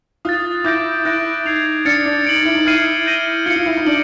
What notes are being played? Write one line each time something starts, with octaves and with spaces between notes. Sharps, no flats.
F4 D#6 F#6 A6
E4 D6 G6 A#6 D7
E4 F#6 A#6 D7
D#4 G#6 C7 F7
D4 F6 A6 C#7
D4
D#4 A6 D7 F#7
D#4
E4
D#4
E4 F6 G#6 C7 D#7
G6 A#6 D#7 G7
F4 G#6 C#7 F#7
F4
E4
D#4
D4 D7 F#7